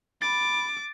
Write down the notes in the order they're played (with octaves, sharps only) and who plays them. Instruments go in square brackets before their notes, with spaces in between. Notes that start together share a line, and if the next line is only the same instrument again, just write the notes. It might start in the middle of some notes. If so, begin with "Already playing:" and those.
[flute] B5 [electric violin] D6 [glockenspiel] A6